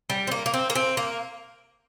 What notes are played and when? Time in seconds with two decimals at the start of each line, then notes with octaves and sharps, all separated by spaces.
0.10 G3
0.27 C4
0.31 A#3
0.46 A#3
0.54 C4
0.70 A#3
0.75 C4
0.97 A#3